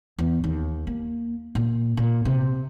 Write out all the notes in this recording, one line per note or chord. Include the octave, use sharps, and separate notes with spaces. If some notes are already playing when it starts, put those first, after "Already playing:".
E2
D#2
A#3
A#2
A#2
C3